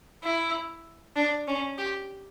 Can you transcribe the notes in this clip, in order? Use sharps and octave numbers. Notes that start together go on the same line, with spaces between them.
E4
D4
C#4
G4